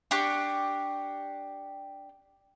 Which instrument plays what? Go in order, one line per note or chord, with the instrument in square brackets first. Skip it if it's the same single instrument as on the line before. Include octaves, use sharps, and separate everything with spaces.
[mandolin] D4 G4 C#6